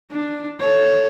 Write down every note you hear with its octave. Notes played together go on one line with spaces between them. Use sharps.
D4
A4 C#5